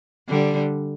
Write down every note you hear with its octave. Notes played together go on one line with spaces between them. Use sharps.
D3 G3